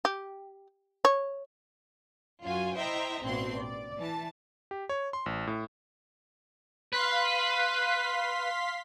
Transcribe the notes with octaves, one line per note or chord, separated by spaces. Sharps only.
G4
C#5
F#2 F4 F#4 G#5
E4 C5 D#5 E5 G5 A#5
A1 G2 B2 C4 F#4 C6
D5
E3 A5
G4
C#5
C6
A1
A2
B4 F5 C6 B6